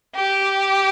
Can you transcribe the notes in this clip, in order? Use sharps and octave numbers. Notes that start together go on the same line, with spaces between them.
G4